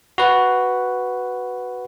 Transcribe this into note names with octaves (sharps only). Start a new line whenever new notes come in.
F#4 B4